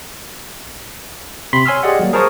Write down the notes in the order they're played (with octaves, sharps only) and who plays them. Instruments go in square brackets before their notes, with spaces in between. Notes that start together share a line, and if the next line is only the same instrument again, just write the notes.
[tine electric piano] C3 C4 B5 C6 B6
C#5 G#5 C6 E6 F6
G4 G#4 D5 D#5 F#5
F#3 G3 A#3
G#4 A#4 C5 A5 C#6 D#6